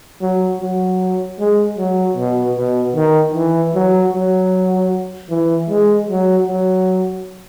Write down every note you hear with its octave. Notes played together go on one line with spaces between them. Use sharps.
F#3
F#3
G#3
F#3
B2
B2
D#3
E3
F#3
F#3
E3
G#3
F#3
F#3